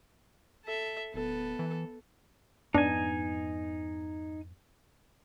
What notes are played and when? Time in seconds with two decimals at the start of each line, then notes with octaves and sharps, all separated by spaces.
0.65 A4 E5
1.14 D1 B3 A4
1.59 E3
2.74 F2 G#2 B3 D4 D#4 G#5